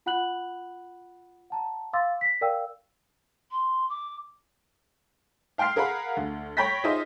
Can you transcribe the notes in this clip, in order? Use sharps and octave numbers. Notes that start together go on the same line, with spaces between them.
F4 F#5 B5 F#6 F#7
F#5 A5 A#5
F5 C6 D6 E6 A6
A#6 B6
A#4 D5 F5 G5 E6
C6
D6
F5 G5 C6 F6 C7
G#4 A#4 F5 F#5 B5
D2
C#5 G5 B5 G6 A#6 B6
D#4 F4 G#4 C5 D#5 E5